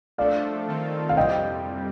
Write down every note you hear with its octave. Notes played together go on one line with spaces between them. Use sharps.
F3 A3 D4 A4 D5 F5
D#3 A3 C4 F4 A4
F5
F2 C3 G3 D#5 G5